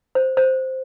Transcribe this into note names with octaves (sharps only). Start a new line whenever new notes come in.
C5
C5